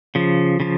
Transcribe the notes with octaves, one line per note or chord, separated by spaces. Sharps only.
C#3 F3
C#3 F3